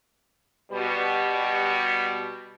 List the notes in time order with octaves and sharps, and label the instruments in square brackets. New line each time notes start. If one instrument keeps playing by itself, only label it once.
[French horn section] B2 G3